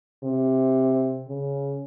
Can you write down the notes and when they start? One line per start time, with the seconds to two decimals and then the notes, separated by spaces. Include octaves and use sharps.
0.24 C3
1.28 C#3